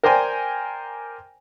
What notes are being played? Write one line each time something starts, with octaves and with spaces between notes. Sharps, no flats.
A#4 C5 D5 G5 G#5